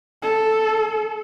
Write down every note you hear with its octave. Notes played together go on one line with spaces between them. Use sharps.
A4